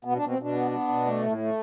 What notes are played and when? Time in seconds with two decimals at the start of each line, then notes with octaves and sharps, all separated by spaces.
0.05 B2 B3
0.16 D4
0.21 B2
0.29 C4
0.38 B2 D4
0.54 B3
0.71 B3
0.88 B2
1.05 A3
1.22 A2
1.38 A3